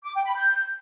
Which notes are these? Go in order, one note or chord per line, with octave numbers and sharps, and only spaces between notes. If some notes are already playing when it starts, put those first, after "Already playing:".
D6
G5
B5
G6